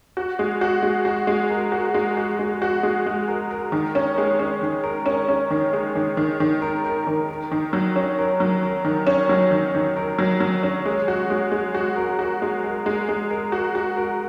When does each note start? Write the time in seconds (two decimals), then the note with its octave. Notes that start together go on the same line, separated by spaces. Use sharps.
0.17 F#4
0.39 G#3
0.61 F#4
0.82 G#3
1.05 F#4
1.27 G#3
1.50 A#4
1.72 F#4
1.94 G#3
2.17 F#4
2.39 G#3
2.62 F#4
2.83 G#3
3.06 G#3
3.28 A#4
3.51 A#4
3.72 D#3
3.95 C#4
4.18 G#3
4.39 C#4
4.62 D#3
4.84 A#4
5.06 C#4
5.28 C#4
5.51 D#3
5.73 G#3
5.95 D#3
6.17 D#3
6.40 D#3
6.62 A#4
6.84 A#4
7.07 D#3
7.29 A#4
7.51 D#3
7.73 F#3
7.96 C#4
8.18 A#4
8.40 F#3
8.63 A#4
8.85 D#3
9.07 C#4
9.29 F#3
9.51 D#3
9.75 D#3
9.96 A#4
10.19 F#3
10.40 F#3
10.63 C#4
10.86 G#3
11.08 F#4
11.30 G#3
11.52 G#3
11.75 F#4
11.96 A#4
12.19 F#4
12.42 G#3
12.64 A#4
12.86 G#3
13.09 G#3
13.31 A#4
13.52 F#4
13.75 F#4
13.97 A#4